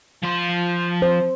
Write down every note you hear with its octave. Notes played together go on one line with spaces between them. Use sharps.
F3 C6
C5